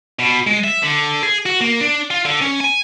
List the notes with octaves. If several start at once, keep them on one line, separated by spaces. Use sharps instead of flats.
B2
G#3
E5
D3
G#4
F#4
A#3
D4
F4
D3
C#4
G#5